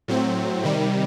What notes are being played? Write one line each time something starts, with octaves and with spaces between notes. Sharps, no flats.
A2 F#3 C4
C3 D#3 G3